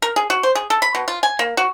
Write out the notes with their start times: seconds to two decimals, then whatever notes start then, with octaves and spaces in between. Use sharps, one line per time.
0.02 A#4
0.16 G#4
0.30 F#4
0.43 C5
0.55 G#4
0.70 A4
0.82 B5
0.95 B2
1.08 F4
1.23 G#5
1.39 A#3
1.57 F#4